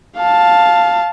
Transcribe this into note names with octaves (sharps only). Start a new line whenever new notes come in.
F5 A5